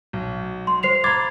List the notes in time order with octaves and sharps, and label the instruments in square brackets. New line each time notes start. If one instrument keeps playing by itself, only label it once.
[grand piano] B1
[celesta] C6
C5 C7 F7
[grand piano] A#5 B5 A6 [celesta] D6 G#6